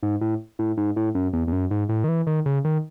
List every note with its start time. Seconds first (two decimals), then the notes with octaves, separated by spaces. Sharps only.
0.03 G#2
0.21 A2
0.59 A2
0.77 G#2
0.96 A2
1.15 F#2
1.33 E2
1.47 E2
1.52 F#2
1.71 G#2
1.89 A2
2.04 D#3
2.08 E3
2.27 D#3
2.46 C#3
2.65 D#3